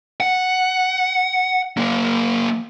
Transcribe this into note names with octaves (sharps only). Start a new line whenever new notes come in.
F#5
F#3 A#3